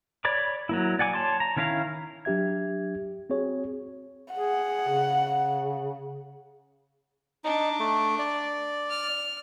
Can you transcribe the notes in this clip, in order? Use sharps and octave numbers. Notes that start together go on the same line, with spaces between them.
C#5 D5 B5 D6
F#3 A#3 E4
D5 F#5 G#5 D6
C#5 A5 C6 D6
A#5
D#3 C#4 E4 F5 A#5
F#3 D4 G4 E5 G#6
C4 F#4 G#4 C#5
G#4 F#5
C#3
D4 D#4
A3
D5
F6